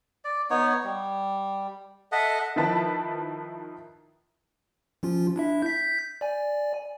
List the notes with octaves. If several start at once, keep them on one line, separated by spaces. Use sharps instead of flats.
D5
B3 D#4 C#5
G3
A4 D#5 E5 F#5
D#3 F3 E4 B4 A5
F3 C#4 F4
D4 E4 E5
G6 B6
D5 G#5